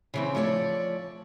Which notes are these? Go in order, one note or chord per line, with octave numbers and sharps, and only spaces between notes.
C#3 E3 C4
F3 A3 C#5 D5